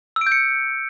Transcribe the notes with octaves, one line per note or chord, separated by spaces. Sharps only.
E6
D7
G6
C#7